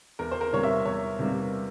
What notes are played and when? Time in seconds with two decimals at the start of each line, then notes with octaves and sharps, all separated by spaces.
0.19 E2 A#4
0.31 C5
0.41 A#4
0.53 C3 E3 G3 A#3 C#5
0.63 E5
0.85 E2 C#5
1.19 C3 E3 G3 A#3